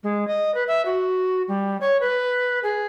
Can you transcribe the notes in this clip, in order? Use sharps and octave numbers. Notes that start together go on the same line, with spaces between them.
G#3
D#5
B4
E5
F#4
G3
C#5
B4
G#4